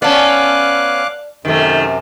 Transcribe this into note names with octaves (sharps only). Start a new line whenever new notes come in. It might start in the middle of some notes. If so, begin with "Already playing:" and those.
B3 C#4 D5 F5 A5 D6 F#6
F#2 C3 D#3 A3